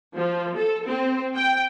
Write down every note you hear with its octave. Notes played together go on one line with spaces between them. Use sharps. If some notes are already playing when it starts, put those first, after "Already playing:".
F3
A4
C4
G5